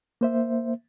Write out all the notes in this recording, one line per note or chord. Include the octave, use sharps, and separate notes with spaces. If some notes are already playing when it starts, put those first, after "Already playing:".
A#3 C5 E5